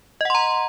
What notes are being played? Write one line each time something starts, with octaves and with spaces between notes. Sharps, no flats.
D#5 F#5 A#5 C6